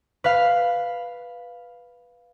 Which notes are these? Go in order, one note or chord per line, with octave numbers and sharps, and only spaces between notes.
B4 F5